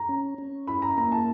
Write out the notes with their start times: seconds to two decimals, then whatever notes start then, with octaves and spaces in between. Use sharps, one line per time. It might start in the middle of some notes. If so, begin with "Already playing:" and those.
Already playing: A#5
0.09 C#4
0.38 C#4
0.67 E4 B5
0.82 A#5
0.97 A#3 A#5
1.12 A5